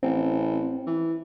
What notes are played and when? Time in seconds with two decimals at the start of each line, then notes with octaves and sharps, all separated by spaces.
0.03 A1 C4
0.87 E3